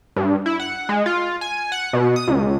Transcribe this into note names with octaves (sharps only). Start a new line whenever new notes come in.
G2
E4
F#5
G#3
F4
G#5
F#5
B2
D#6
C#2